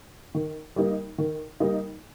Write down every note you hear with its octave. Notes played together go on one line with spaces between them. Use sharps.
D#3
G3 A#3 D#4
D#3
G3 A#3 D#4